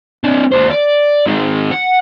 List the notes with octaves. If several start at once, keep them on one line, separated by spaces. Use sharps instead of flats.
C4 D4
D#2 C5
D5
D#3 G#3
F#5